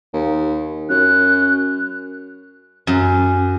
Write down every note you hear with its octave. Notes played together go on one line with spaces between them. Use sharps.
D#2
F#2 F#6
F#2